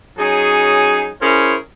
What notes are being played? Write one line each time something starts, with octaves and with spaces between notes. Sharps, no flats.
F#3 C#4 D#4 G#4
C#4 E4 G#4 A#4 C5 C#5